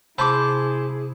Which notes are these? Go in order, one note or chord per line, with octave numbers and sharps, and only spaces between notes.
C3 E4 G#4 C5 A5 B5 D6